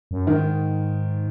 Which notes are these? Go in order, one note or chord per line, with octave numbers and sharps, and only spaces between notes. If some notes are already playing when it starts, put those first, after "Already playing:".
F#2
G#2 D#3